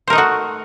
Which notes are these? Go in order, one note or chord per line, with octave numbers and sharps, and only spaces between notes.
A3 D#4 F#4 A#4 C5